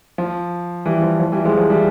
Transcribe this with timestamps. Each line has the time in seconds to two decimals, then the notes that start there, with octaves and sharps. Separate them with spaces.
0.18 F3
0.86 E3 G3
1.02 F3
1.20 F3
1.32 E3 G3
1.45 F3 G#3
1.57 F3
1.70 E3 G3